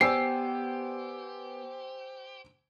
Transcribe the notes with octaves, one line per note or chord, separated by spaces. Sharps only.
B3 G4 C5 D5 G#5 E6 C7